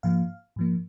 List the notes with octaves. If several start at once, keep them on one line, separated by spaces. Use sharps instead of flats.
G#2 F3 A#3 F5
G#2 F3 A#3